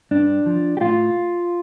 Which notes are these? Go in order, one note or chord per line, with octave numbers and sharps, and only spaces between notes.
G2 D4
F3
G4
A2 F4